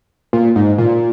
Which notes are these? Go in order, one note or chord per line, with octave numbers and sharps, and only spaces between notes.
A#2
G#2
A#2